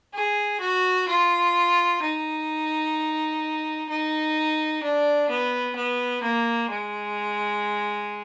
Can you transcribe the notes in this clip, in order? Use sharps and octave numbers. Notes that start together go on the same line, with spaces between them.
G#4
F#4
F4
D#4
D#4
D4
B3
B3
A#3
G#3